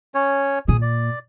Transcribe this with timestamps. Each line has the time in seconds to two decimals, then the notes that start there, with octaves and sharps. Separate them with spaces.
0.15 C#4 C#5
0.68 A#2 G#4 D#6
0.82 D5